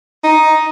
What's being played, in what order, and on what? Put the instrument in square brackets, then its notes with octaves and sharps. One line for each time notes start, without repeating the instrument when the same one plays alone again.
[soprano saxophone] D#4